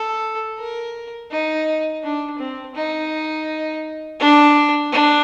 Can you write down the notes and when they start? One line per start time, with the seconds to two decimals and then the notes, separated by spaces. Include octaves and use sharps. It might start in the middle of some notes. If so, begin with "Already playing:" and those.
Already playing: A4
0.59 A#4
1.31 D#4
2.04 D4
2.39 C4
2.75 D#4
4.20 D4
4.92 D4